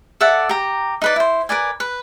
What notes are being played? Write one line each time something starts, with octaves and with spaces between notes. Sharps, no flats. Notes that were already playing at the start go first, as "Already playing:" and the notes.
A4 D5 E5 F#5
G4 A#5
D#4 B4 D5
E4 C5
A#4 B4 D5 G#5
B4